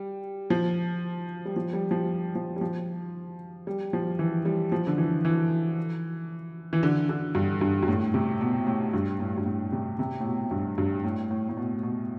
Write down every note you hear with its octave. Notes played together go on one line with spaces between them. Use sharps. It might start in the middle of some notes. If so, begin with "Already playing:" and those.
Already playing: G3
F3
G3
F3
G3
F3
F3
G3
F3
G3
F3
E3
G3
F3
D3
E3
E3
E3
D3
D3
G2
G2
G2
A2
C3
B2
A2
G2
A2
G2
A2
C3
C3
A2
B2
A2
G2
G2
A2
A2
A2
B2
B2